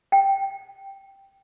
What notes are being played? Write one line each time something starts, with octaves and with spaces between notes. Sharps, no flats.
G5